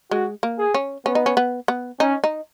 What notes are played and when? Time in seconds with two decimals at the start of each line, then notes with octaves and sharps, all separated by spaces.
0.11 G#3 F#4
0.43 A#3
0.58 G#4
0.74 C#4
1.05 B3 C#4
1.15 D#4
1.26 C#4
1.37 B3
1.68 B3
2.00 C#4 D#4
2.24 D#4